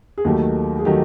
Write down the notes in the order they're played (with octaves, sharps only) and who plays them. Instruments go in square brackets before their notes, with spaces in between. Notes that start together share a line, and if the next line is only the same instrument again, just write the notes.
[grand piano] G#4
D#2 D#3 F#3 A3 G4
G#4
D#3 F#3 A3 G4